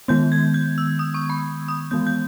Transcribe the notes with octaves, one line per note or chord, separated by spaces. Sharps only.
D#3 G#3 B3 G6
G#6
G6
E6
D#6
C#6
B5
D#6
E3 G#3 B3 G6
G6